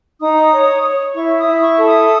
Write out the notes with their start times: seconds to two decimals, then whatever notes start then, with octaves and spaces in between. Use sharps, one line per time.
0.21 D#4 D#6
0.52 C#5
0.83 C#5
1.14 E4 C#6
1.38 D#6
1.46 E4
1.61 C#6
1.77 A4
1.85 D#6